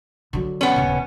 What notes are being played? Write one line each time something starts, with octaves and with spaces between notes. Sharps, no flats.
D3 F#3
B3 C#4
D#1 C#3